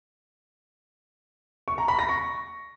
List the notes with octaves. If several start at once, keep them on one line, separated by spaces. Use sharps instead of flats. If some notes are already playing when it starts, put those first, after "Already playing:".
C#6
A#5
B5
A#6
C#6